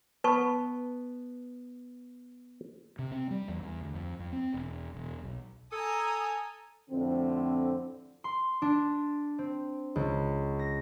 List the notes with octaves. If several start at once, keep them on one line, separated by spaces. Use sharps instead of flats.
B3 B4 A5 C#6
C3
C4
G3
E2
E2
D2
F2
F2
C4
E1
E1
B1
A4 G#5 A#5 D#6
F2 A2 D3 C4
C6
D4
C4
C#2
A#6